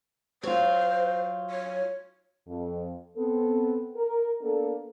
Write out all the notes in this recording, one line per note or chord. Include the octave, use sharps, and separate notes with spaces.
F#3 F4 C5
C#5
F2
B3 C4 A4
A#4
A#3 B3 D4 A4